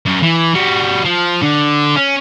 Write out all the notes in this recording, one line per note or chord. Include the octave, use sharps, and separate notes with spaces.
F#2
E3
G3 F#4
F3
D3
C#4